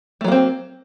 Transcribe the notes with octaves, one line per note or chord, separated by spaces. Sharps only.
F#3 A3 A#3 C4